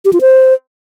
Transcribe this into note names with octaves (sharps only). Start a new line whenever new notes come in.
G4
F4
C5